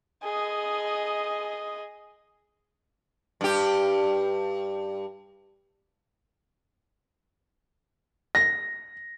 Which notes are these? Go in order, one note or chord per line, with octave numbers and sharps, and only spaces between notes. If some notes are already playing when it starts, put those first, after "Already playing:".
G#4 D#5
G2 G4
A#6